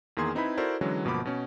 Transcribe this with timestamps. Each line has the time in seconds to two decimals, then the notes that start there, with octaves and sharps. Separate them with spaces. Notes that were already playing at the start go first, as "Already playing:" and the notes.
0.17 E2 D#3 A#3 G#4 C6 G#6
0.35 C4 D#4 E4 B4 B5
0.57 E4 F#4 A4 A#4 C5 D5
0.81 D3 E3 F#3 G#3 C#4
1.05 G1 B2 F3 A#3 B5 D6
1.25 B2 C#4